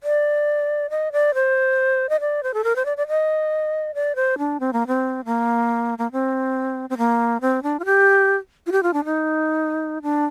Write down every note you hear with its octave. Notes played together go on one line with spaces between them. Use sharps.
D5
D#5
D5
C5
D#5
D5
C5
A4
A#4
C5
D5
D5
D#5
D5
C5
D4
C4
A#3
C4
A#3
A#3
C4
C4
A#3
C4
D4
F4
G4
F4
G4
F4
D4
D#4
D4